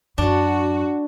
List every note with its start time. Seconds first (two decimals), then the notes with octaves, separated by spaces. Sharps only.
0.18 F#2 D4 F#4